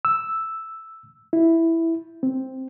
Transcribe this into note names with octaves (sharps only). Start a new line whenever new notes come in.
E6
E4
C4